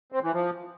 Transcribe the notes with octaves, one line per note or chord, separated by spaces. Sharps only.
C4
E3
F3